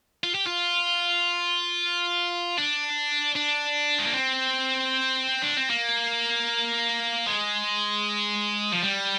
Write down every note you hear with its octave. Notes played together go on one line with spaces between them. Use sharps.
F4
G4
F4
D4
D4
G#3
A#3
C4
D4
C4
A#3
G#3
F3
G3